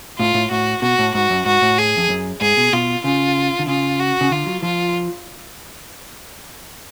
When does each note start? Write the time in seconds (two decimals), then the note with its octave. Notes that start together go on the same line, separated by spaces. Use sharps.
0.18 A2 F4
0.34 A2
0.51 A2 F#4
0.82 B2 F#4
0.99 A2
1.14 G#2 F#4
1.30 F#2
1.45 G#2 F#4
1.62 A2
1.78 G#4
1.97 F2
2.09 F#2
2.41 G#2 G#4
2.57 B2
2.73 B2 F4
3.04 C#3 F4
3.59 D3
3.67 C#3 F4
3.99 F#4
4.21 C#3
4.31 D3 F4
4.46 F#3
4.63 F3 F4